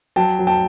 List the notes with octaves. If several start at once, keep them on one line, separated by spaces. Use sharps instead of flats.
F#3 G5 A5
F#3
G5 A5